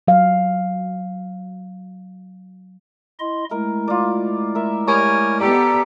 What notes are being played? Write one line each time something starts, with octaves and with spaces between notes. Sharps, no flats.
F#3 F5
E4 D#5 C6
G#3 A3 E4 A#4
F4 D5
A#4 E5
G3 A#4 C#5 G#5
B3 G4 A4 D5 A#5